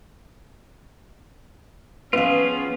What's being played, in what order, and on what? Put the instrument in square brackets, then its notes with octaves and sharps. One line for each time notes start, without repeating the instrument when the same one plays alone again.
[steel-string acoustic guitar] F3 B3 [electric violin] C#4 [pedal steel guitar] F4 G#4 [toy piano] B4 F5